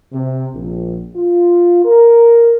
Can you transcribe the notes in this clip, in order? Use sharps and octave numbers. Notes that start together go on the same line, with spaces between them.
C3
A#1
F4
A#4